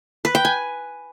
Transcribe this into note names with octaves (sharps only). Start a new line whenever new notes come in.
B4
G5
G#5